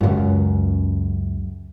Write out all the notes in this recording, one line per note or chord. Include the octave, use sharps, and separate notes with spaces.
C#2 F#2